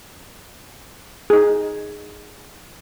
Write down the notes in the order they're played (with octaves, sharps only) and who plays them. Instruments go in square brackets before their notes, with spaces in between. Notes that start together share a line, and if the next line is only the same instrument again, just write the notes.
[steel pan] D#4 G#4